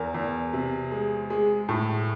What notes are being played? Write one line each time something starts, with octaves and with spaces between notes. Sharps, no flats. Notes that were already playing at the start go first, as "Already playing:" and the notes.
Already playing: E2 A#4
E2
C3
G#3
G#3
A2